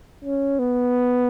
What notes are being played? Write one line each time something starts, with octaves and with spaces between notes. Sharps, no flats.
C#4
B3